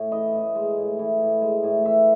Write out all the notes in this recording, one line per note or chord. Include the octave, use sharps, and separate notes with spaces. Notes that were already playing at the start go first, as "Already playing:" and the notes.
Already playing: A2
E3 D#5
A2
G#3
A2
E3
A2
G#3
A2
E3 E5